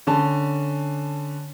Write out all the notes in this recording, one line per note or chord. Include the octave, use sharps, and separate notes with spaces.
D3 C#4 A5